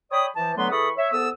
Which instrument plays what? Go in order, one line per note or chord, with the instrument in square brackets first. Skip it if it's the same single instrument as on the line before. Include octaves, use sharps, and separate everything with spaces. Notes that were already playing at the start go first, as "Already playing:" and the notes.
[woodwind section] C#5 D5 G5 B5 D#6
E3 F3 A5
D3 F#3 A3 B3 B4 C6
E3 G#4 A4 B5 C#6 D#6
C#5 E5
C2 B3 A4 D#6 E6